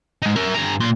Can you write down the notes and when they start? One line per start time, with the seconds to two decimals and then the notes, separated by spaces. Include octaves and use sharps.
0.22 G#3 D#4
0.36 A#4 E5
0.55 G2 A#5
0.80 A#2 C6